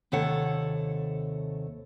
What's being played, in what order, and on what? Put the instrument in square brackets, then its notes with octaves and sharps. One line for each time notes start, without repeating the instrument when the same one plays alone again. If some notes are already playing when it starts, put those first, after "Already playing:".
[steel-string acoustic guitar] D#2 C3 A4 C#5 F#5